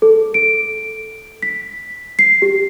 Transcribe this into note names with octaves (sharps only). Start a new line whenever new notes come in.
A4
D7
B6
C7
G4